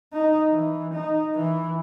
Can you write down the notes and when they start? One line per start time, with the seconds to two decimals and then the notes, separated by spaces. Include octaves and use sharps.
0.13 D#4
0.49 E3
0.94 D#4
1.36 E3